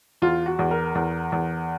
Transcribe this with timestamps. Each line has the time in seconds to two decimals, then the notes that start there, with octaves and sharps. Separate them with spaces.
0.22 E2 F4
0.46 F#4
0.59 E2
0.71 A#4
0.95 E2
1.32 E2